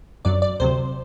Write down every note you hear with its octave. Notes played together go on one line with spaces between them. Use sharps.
G1 F#2 F#3 D5
D5
D2 C3 F#3 C5